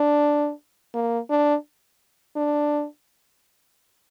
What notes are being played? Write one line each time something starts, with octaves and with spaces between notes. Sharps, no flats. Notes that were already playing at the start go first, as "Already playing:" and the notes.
Already playing: D4
A#3
D4
D4